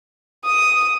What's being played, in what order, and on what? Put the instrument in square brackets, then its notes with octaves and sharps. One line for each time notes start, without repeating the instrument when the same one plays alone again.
[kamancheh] D#6